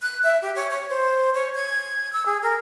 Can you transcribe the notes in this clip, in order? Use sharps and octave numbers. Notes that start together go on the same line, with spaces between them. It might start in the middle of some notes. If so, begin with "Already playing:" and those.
F#6
E5
G4
C#5
C#5
C5
C#5
G#6
E6
G#4
A#4